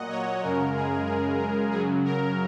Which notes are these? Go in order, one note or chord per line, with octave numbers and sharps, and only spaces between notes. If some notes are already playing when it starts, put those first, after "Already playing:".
Already playing: A#2 F#3 D#5 F#5
C#5
F#2 C#3 G#3 A#4
G#4
G#4
A#4
F#2 C#3 F#3 G#4
A#4